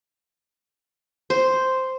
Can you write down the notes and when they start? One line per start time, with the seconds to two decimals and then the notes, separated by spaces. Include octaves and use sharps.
1.30 C5